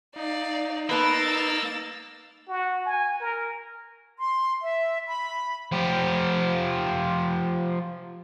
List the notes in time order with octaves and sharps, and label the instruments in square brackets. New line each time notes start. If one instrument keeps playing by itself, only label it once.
[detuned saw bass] D#4 [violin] D5 F5
[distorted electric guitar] A#3 [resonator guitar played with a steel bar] B3 B4 A5 [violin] E6 A6
[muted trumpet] F#4
G#5
A#4
[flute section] C6
E5
B5
[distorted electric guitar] F3 G4